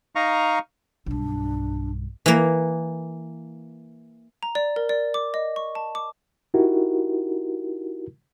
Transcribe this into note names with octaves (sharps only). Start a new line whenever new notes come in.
D#4 F5 A#5 C#6
B1 G2 D4
E3 A#3
A#5
D5
A#4
D5
D6
D#5
C#6
A5
D6
D#4 E4 F#4 G4 A#4